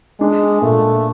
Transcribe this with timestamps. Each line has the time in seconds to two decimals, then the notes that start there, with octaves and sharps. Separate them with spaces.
0.20 G#3 D4
0.62 A#2 A3